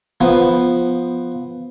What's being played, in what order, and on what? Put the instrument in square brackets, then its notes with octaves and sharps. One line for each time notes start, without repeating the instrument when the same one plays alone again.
[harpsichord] F3 B3